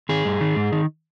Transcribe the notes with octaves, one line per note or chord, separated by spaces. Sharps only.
D#3 G#4
G2
D#3
G#2
D#3